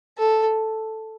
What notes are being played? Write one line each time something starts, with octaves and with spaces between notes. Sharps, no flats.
A4